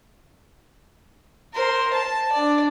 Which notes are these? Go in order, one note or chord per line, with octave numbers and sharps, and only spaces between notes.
A#4 C5
A5
D4 D5